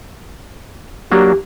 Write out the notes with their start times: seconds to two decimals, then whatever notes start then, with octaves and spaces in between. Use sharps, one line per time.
1.12 F#3 A#3 D4 G4